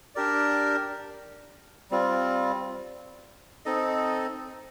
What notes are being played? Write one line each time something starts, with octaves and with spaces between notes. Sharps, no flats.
D4 G4 A#4 D5
G3 C4 F4
C4 D#4 A4 D#5